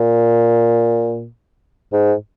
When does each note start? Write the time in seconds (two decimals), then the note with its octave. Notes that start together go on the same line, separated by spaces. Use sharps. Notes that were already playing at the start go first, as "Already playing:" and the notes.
Already playing: A#2
1.93 G#2